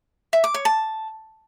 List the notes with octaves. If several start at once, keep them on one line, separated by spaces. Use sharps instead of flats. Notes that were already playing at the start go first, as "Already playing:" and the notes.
E5
D6
C#5
A5